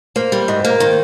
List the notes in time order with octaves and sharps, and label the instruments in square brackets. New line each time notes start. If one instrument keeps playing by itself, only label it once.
[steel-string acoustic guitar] A#3 [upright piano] C5
[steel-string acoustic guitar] G3
[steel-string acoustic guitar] G#2 [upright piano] D#5
[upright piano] C5
[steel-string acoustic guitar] A#3
[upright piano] A#4
[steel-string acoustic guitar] D#3 [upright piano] C5